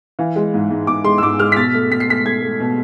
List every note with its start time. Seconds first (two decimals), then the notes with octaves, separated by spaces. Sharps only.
0.19 E3 F5
0.36 G#3
0.54 G#2
0.71 G#2
0.87 G#2 D6
1.04 G#3 C6
1.18 E6
1.22 G#2 D6
1.39 G#3 F6
1.52 B6
1.57 B2 A6
1.74 A3
1.91 B2 B6
2.00 C7
2.09 A3 B6
2.25 A3 G#6
2.42 A3
2.60 B2